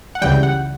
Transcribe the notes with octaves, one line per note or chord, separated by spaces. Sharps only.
F#5
C#2 C#3 E3 G3 G5
F#5